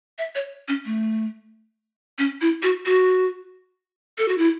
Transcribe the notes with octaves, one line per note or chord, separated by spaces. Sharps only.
E5
C#5
C#4
A3
C#4
E4
F#4
F#4
A4
F#4
E4